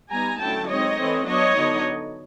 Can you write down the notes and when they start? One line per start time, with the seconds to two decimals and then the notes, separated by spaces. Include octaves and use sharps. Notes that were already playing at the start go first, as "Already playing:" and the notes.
0.11 G3 B3 D#4 G#5 A#5
0.40 D3 F#3 A3 C#4 E4 G5 A5
0.69 G#3 C4 D#4 C#5 D#5
0.98 E3 A3 C4
1.26 F#3 B3 D4 C#5 D#5
1.56 D3 F#3 B3 D#4